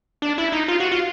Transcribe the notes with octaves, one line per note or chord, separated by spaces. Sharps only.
D4
E4
D#4
F4
F#4
F4